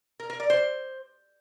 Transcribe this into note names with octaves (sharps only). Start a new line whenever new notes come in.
A#4
A#4
D5
C5